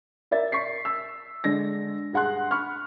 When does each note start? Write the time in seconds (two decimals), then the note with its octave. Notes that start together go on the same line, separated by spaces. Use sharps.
0.31 A#4 D5 E5 A6
0.52 C#6 B6 C7
0.85 E6
1.44 D3 G#3 D4 A#6
2.13 G2 G#4 F#5 C6 F#6
2.51 B5 C#6 F6